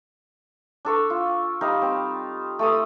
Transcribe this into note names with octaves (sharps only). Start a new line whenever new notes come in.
D4 A4 C#6
F4
G3 D#4 F5
C4
A3 A4 D#6